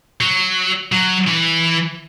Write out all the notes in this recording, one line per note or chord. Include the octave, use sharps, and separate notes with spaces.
F#3
F#3
E3